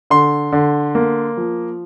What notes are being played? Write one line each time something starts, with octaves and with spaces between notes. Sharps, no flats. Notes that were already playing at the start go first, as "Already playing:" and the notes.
D3 C6
D3
A#3
F3